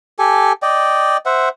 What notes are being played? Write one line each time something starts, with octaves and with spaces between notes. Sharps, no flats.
G4 A4 G#5
D5 D#5 G5
C5 E5 F#5